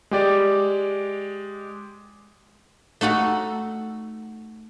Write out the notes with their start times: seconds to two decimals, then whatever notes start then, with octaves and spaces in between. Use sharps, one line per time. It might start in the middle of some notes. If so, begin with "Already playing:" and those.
0.11 G#3 G4 D5
3.01 A3 D#4 F#4 A4